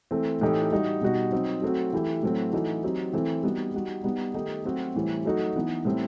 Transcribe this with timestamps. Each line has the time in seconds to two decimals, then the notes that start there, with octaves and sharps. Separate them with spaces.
0.11 E3 A3 C4
0.41 A2 E3 A3 D#4 G4
0.72 G3 D#4 F#4
1.01 B2 G3 D#4 F#4
1.32 F#3 C4 D#4
1.62 F#3 A3 C4 F#4
1.93 E3 A3 E4 G4
2.23 A2 F#3 A3 C4 F#4
2.53 E3 A3 D#4 F#4
2.84 F#3 C4 D#4 G4
3.13 E3 A3 C4
3.43 G3 B3 D#4 F#4
3.74 G3 D#4 F#4
4.04 G3 B3 D#4
4.34 D#3 A3 D#4 G4
4.65 F#3 A3 C4 F#4
4.95 A2 E3 G3 C4
5.25 F#3 A3 D#4 F#4
5.56 E3 B3 D#4
5.85 A2 G3 C4